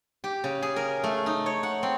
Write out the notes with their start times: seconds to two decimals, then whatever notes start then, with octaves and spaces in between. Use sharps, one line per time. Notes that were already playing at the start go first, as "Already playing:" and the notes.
0.24 G4
0.44 C#3
0.62 G#4
0.76 A#4
1.04 A3
1.26 D#4
1.46 C#5
1.63 F#5
1.83 C4